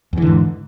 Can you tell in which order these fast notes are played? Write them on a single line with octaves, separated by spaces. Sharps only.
E2 E3 D3 G#2